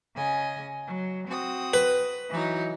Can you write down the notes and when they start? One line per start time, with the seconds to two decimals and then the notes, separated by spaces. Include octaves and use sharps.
0.14 C#3 D#5 G#5
0.85 F#3
1.27 C4 F#4 D#6
1.74 B4
2.29 E3 F#3 D#4